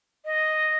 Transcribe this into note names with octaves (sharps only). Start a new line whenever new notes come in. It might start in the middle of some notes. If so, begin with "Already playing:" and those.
D#5